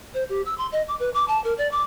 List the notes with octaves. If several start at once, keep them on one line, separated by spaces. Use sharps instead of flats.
C5
G4
E6
C6
D#5
D6
B4
D6
A5
A#4
D5
D6